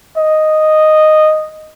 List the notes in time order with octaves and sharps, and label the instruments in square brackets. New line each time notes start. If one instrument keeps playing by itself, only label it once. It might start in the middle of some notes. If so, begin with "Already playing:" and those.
[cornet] D#5